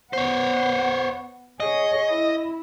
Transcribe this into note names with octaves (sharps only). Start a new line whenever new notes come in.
B3 C5 C#5 F#5
G#4 C#5 D#5
E4